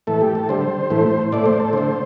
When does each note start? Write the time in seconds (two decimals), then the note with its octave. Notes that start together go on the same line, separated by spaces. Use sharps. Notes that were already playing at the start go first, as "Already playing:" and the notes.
0.07 A2 E3 A3 A4
0.21 G4
0.35 A4
0.49 D3 G3 C5
0.90 A2 E3 A3
1.32 A2 A3 D5
1.46 C5
1.60 A4
1.73 D3 A3 C5